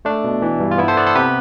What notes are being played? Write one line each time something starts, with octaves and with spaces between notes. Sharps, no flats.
A3 D4
B2
E3
G2
F4
B3 E4
A4 C5
B3 B4 D5
A4 C5
C3 G4 B4